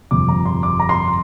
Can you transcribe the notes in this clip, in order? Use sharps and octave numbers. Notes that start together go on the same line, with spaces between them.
G1 F2 C3 D6
A#5
C6
D6
A#5
C6